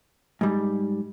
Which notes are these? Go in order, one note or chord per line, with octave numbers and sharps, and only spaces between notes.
G#2 G3